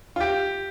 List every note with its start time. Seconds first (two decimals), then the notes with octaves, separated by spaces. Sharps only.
0.16 F4
0.20 G4